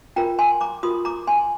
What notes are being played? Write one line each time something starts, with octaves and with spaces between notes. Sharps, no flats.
F4 A#4 G5 A#5
G#5 C6
A#5 D6
F4 A#4 C6 D#6
A#5 D6
G#5 C6